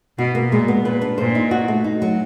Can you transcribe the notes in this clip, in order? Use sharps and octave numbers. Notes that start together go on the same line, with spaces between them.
B2 F#4
A#3
A#2 G#3
B3
A#2 B4
D4
A#2 C5
D#4
F#4
A3
D#4
F#3